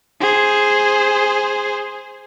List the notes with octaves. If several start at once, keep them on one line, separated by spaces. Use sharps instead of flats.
G#4 C5